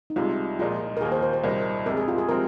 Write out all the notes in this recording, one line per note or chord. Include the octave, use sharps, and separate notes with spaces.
D#4
C2 C3 G#3 F4
A#2 F3 G#3 D#4 F4
A#4
D#2 D#3 A#3 G#4
C5
C5
C5
C2 A#2 A#3 D#4
F2 C3 G#3 A#4
G#4
F4
G#4
C3 F3 G#3 C4 A#4